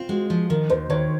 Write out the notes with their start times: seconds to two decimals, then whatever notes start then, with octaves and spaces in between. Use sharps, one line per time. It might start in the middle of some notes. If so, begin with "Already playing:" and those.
Already playing: C4 F4
0.09 G#3 F#4
0.30 F3
0.49 D#3 A#4
0.70 D#2 C5
0.90 D#3 C#5